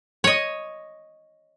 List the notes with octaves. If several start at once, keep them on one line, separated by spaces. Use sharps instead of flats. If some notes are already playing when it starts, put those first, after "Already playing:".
C#5 D#5